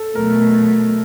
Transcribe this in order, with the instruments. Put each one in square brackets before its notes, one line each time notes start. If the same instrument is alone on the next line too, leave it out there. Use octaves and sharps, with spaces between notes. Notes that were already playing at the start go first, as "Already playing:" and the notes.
Already playing: [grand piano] A4
[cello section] B2 F#3 A3 [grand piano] A#4